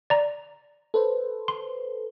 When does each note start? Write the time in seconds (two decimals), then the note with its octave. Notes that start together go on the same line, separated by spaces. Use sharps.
0.10 D5 A#5
0.94 A4 B4 C5
1.48 C6